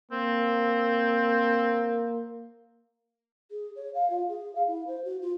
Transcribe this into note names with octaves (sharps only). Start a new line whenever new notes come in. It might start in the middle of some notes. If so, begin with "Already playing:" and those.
A#3 C4
G#4
C#5
F5
F4
G#4
F5
E4
C5
F#4
F4